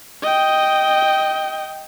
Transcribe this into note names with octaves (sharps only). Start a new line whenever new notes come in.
D#5 G5